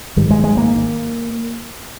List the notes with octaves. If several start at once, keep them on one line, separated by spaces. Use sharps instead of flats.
G#1 G#2 D#3 G3
G#3
G#3
A#3